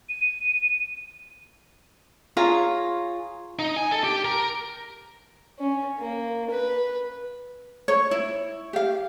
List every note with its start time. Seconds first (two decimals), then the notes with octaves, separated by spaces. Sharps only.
0.09 D#7
2.37 F4 G#4 C#5 A#5
3.59 D#4
3.77 G#5
3.92 A4
4.04 G4
4.25 A#4
5.59 C#4
5.99 A#3
6.51 B4
7.88 C#5
8.11 E4
8.73 G4 F5